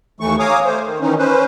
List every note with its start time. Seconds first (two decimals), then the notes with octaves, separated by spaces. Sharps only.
0.20 D#2 E3 A3 C#6
0.39 C#5 F5 G#5 A#5 D6 D#6
0.65 A3 C5
0.85 D#3
1.01 D#3 E3 C#4 D#4
1.18 C#4 B4 C5